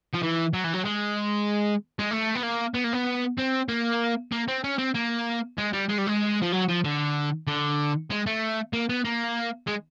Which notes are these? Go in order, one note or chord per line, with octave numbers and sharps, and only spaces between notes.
F3
E3
F#3
E3
F#3
G#3
G#3
A3
B3
A#3
B3
A#3
B3
C4
A#3
A#3
C4
C#4
C4
A#3
G#3
G3
G#3
G3
G#3
F3
F#3
F3
D3
D3
G#3
A3
A#3
B3
A#3
G#3